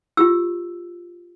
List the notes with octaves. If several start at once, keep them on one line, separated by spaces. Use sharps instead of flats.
F4 G4 E6